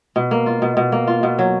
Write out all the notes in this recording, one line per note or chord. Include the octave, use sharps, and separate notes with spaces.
B2
A#3
F4
B2
B2
A#3
F4
B2
F#3